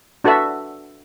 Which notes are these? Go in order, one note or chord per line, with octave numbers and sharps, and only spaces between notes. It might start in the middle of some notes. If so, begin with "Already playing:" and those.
D4 F#4 A4 B4 E5